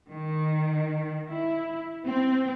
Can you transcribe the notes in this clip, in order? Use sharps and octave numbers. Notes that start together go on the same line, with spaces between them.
D#3
E4
C4